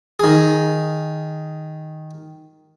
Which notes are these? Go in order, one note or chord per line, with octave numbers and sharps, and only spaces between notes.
D#3 G#4